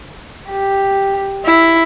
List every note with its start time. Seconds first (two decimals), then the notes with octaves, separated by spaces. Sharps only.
0.50 G4
1.45 E4